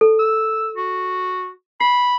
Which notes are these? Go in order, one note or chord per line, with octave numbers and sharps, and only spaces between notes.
A4
E6
F#4
B5 C7